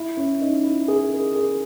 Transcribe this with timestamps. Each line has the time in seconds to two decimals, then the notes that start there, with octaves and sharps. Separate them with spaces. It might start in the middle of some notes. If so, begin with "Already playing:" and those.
Already playing: E4
0.17 C#4
0.41 D#4
0.64 E4
0.88 G#4
1.12 A#4
1.36 G#4